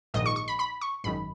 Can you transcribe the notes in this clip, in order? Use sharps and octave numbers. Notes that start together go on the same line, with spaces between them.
A#1 G#2 D#3 D#5
C#6
C#6
B5
B5
C#6
G#1 F#2 D#3 B5